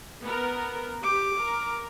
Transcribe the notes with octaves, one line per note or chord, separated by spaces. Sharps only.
B3 A#4
G4 D6
A#4